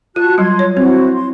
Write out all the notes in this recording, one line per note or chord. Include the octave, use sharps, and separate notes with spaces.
F4 F#4 A5 F#6
F#3 G3 C6 G#6
C#5
C4 E4 F#4 C5
C6